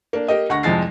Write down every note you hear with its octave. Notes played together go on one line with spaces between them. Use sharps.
A#3 D4
A#3 G4 D#5
D2 F#5 C#6 A#6
C2 F2 F3 G#3 A6 C7